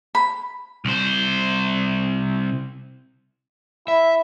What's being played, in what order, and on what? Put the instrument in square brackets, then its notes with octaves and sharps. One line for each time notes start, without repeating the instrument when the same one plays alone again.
[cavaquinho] B5
[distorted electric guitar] C2 C5
[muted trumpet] E4 [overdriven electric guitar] E5